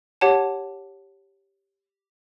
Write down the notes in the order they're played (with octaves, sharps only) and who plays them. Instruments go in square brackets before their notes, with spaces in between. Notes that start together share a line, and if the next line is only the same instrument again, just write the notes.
[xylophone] G4 C#5 F#5 A5